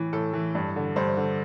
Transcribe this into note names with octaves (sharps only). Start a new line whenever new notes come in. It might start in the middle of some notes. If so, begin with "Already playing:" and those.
Already playing: A2 E3
A2 A4
E3
G2
D3
G2 C5
D3